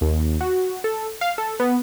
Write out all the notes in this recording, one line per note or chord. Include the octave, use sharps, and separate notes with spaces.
D#2
F#4
A4
F5
A4
B3